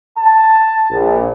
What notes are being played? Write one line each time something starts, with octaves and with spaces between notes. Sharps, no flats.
A5
A#1